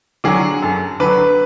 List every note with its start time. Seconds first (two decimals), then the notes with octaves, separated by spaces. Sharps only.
0.24 D3 F#3 G#4
0.62 F#2 A4
1.00 D3 F#3 B4